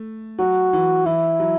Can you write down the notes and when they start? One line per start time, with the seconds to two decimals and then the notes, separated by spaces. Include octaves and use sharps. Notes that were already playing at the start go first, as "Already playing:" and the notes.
Already playing: A3
0.39 F#3 F#4
0.73 E3
1.06 E3 E4
1.40 F#3